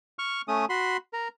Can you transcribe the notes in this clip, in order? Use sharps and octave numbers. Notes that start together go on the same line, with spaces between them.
C#6 F6
A3 C#4 D#6
F#4 B5 C6
A#4